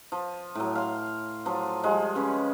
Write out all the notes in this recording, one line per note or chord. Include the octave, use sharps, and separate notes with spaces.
F3
A2 F#3
F5 C6
F3 F#3
F3 G3 G#3
C#3 C#4 B4